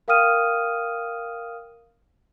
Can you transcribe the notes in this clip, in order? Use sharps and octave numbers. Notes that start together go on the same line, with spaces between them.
A#4 F5 G5 D#6 F6 D#7